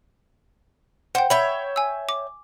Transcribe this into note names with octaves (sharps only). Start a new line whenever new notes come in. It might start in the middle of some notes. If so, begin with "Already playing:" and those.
C5 F#5 G5
C#5 E5 G5 B5
G#5 E6
D6